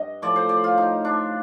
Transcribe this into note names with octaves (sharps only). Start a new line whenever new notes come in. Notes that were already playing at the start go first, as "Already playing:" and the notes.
Already playing: G2 D#5
A2 F3 D5
C5
D5
F4
D#4
D4